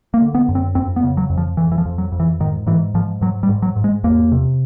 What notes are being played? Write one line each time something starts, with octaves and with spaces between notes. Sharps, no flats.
A#3
D3
B3
F#2
C4
F2 C4
B3
C#3
F#3
F2
F3
F2 E3
E3
F3
F2
F#3
F2
E3
G#2 D#3
G#2 E3
G#2 F3
G#2 F#3
G3
G#2
F#3
G#2
G#3
E2 A#3
C3